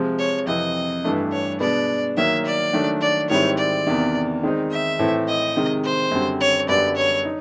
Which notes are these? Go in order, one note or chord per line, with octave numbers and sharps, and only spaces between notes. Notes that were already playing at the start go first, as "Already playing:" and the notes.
Already playing: C3 F3 G#3
C#5
F2 C3 E3 D#5
G2 E3 A3 D4
C#5
B2 G#3 B3 D4 D5
D#3 F#3 A#3 E5
D5
D#3 F#3 A3 D4
D5
G#2 D#3 G3 C4 E4 C#5
D5
E2 C3 D#3
D#3 G#3 C4 D#4
E5
A2 E3 A3 C4
D#5
C3 D#3 G#3
C5
F#2 D3 G3 C4
C#5
F#2 D3 G3 B3 D5
C#5
D#4